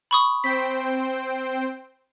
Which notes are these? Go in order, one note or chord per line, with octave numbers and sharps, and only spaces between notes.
B5 C#6 D#6
C4 C5 G5 B6